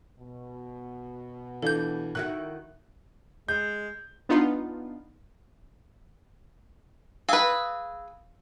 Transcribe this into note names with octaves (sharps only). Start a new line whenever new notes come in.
B2
E3 D4 F4 A4 G6
D#3 E4 F#4 F#6
G#3 G6
B3 D4 D#4 F4
G#4 B4 F5 E6